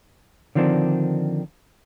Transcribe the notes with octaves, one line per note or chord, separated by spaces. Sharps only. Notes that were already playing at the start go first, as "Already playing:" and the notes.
D3 D#3 F3 C4 D4